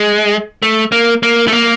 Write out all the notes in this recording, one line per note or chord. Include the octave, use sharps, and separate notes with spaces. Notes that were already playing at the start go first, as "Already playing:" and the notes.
Already playing: G#3
A3
A#3
A#3
A3
A#3